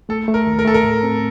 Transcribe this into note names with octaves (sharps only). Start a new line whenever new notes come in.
A3 A4
A3
A#4
D#2
A#4
A3 A4
A#4
A2
C4